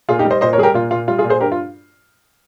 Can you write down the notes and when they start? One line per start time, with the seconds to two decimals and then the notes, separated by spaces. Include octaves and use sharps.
0.09 A#2 F4 G#4
0.19 D#4 G4
0.25 G3
0.30 C5 D#5
0.41 A#2 C5 D#5
0.53 A#4 C#5
0.58 G3 G#4
0.63 G4 A#4
0.74 A#2 F4
0.91 A#2 F4
1.08 G3 F4
1.18 F4 G#4
1.24 A#2
1.30 G#4 C5
1.41 G2 G4 A#4
1.52 F4